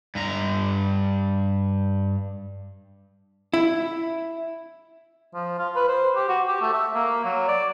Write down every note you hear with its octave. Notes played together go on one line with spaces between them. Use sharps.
G2 A#5
E4
F3
F4
B4
C5
G4
F#4
G4
A3
E5
A#3
F#3
D5